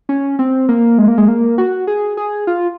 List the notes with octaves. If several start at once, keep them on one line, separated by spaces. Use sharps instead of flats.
C#4
C4
A#3
G#3
A#3
G#3
A#3
F#4
G#4
G#4
F4